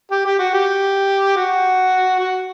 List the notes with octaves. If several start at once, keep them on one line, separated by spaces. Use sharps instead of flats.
G4
G4
F#4
G4
F#4
F#4